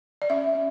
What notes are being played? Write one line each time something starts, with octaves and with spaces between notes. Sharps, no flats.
D5
C#4 E5
C#4